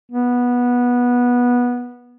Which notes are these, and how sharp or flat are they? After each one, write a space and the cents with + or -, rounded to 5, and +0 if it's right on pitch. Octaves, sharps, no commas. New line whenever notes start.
B3 -15